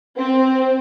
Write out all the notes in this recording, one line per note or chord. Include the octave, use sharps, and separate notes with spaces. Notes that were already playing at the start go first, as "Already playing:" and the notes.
C4